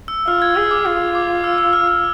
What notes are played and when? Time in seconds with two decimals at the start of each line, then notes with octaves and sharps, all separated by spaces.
0.08 E6
0.27 F4 F6
0.42 G#6
0.56 G#4 E6
0.71 D6
0.85 F4 D6
1.15 D6
1.44 E6
1.58 E6
1.73 F6
1.88 F6